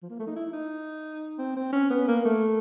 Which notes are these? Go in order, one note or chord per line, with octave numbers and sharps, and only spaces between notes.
F3
A#3
A3
D#4
E4
D#4
C4
C4
C#4
B3
A#3
A3